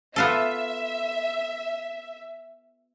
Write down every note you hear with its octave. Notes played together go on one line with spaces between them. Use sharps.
B3 F4 A4 E5